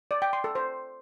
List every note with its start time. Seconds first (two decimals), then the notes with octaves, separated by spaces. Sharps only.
0.11 D5
0.22 G5
0.33 C6
0.44 A4
0.55 C5